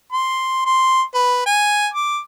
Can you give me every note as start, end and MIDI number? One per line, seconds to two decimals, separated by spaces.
0.12 0.63 84
0.65 1.02 84
1.14 1.44 71
1.46 1.87 80
1.94 2.19 86